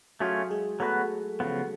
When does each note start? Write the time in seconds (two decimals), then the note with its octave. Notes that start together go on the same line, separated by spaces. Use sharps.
0.20 F#3 A3 C#4 F4 F#4 G#4
0.50 G#3 G#4
0.80 F#3 A3 B3 F#4 A4 B4
1.40 C#3 F3 B3